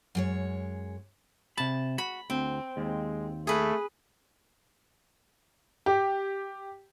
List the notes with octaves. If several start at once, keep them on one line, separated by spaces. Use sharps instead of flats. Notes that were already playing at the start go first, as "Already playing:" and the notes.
F#2 G#3 C#5
C3 A5 B5
F#4 B5
D2 C4
D#2 G#3
A3 G#4 B4
G4